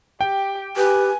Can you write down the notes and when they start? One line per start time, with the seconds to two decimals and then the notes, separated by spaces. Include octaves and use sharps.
0.21 G4 G5
0.77 G4 B4 G#5